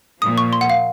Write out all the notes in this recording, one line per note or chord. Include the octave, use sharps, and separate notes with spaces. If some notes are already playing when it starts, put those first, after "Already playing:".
A#2 F3 A#3 D#6
C#6
C6
F#5
F5